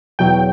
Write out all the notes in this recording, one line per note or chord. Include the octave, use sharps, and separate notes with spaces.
E2 B2 F#3 G5